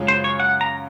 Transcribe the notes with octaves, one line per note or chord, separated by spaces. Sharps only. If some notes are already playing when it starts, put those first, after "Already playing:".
Already playing: F#2 C#3 G#3 C#4 F4
C5
C#5
F#5
A#5